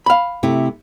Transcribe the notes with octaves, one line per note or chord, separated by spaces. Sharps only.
F5 B5
C3 A3 E4